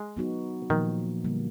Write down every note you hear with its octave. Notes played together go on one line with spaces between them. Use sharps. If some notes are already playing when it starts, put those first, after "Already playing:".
Already playing: G#3
F#3 B3 D#4 F#4
A#2 D#3 F3 A#3
D3 G3 A#3